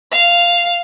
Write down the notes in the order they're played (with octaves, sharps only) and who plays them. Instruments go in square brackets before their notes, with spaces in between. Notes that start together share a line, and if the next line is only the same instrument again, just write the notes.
[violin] F5